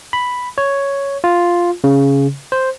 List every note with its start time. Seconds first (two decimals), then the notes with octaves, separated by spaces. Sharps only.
0.13 B5
0.58 C#5
1.24 F4
1.84 C#3
2.52 C5